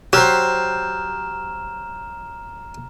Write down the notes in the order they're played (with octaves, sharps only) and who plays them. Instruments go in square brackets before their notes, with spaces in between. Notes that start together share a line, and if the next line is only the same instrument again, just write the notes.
[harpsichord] F#3 [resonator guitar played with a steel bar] G4 C5 [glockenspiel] A#5 F6 E7